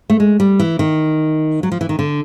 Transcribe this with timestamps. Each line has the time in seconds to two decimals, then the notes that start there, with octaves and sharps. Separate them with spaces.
0.10 A3
0.20 G#3
0.40 G3
0.60 E3
0.79 D#3
1.63 F#3
1.72 F3
1.81 E3
1.89 D#3
1.99 D3